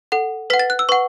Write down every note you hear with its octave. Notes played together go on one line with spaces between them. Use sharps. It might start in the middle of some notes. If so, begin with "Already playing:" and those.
A4 F#5
B4 F#5 B6
A6
F#6
E6
B4 F#5 C#6